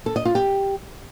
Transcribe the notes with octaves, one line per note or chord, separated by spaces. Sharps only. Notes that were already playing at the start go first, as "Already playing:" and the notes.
A4
D#5
F4
G4